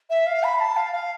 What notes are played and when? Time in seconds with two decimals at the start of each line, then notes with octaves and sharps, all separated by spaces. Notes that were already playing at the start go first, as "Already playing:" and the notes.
0.10 E5
0.26 F5
0.43 B5
0.60 A5
0.76 F5
0.93 F5